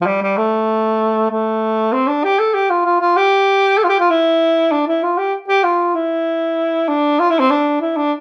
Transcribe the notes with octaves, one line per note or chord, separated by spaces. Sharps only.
F3
G3
G3
A3
A3
C4
D4
G4
A4
G4
F4
F4
F4
G4
A4
F4
G4
F4
E4
D4
E4
F4
G4
G4
F4
E4
D4
F4
E4
C4
D4
E4
D4